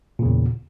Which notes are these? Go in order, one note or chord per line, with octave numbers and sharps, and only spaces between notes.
E2 A#2 C#3